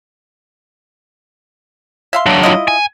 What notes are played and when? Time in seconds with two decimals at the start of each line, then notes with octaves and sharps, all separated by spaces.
2.13 E5 F5 C6
2.26 F#3 D4
2.43 E4 F4 D#5
2.68 G#5